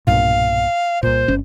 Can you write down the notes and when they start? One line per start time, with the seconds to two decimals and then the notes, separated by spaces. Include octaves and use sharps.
0.07 B1 G2 A#2 F5
1.03 C2 A#2 C5
1.28 G1 C#4